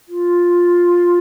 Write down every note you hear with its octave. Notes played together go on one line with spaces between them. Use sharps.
F4